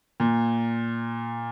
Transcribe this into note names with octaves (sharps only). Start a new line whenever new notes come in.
A#2